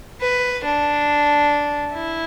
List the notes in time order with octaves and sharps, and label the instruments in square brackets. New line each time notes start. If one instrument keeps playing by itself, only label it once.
[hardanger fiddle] B4
D4
E4